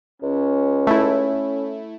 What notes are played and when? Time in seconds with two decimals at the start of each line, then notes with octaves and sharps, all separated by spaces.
0.22 C#2 C#4
0.87 A3 E4